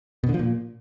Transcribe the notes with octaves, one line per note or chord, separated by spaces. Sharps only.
B2
D3
F3
A#2